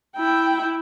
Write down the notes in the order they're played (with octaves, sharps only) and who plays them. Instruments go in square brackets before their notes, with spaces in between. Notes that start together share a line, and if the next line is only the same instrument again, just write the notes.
[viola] E4 G5